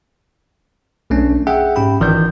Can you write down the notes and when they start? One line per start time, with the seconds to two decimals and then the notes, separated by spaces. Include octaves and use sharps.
1.10 B1 A3 C#4 D4
1.47 G#4 E5 F#5 G5
1.76 G#2 C#4 G4 G5 B5
2.00 G1 D#3 E3 D5 G6